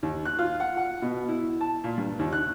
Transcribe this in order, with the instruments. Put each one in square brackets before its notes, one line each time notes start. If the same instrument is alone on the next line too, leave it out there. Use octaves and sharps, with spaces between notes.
[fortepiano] D#2
F#6
F4
F#5
F#5
B2
E4
A5
A#2
G2
D#2
F#6